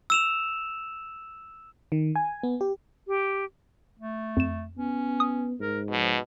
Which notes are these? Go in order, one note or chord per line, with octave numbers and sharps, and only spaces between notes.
E6 E7 F7
D#3
G#5
B3
G4
G4
A3
F2 E7
B3 C#4
D#6
G#2 A#4
B2 F3